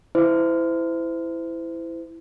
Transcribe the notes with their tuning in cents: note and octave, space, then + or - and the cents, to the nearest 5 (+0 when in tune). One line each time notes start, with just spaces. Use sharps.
E4 +0 C5 -35